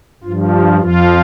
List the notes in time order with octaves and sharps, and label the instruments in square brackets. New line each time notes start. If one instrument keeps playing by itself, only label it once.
[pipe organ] G2 F4
F3
G4
F2 F3 F4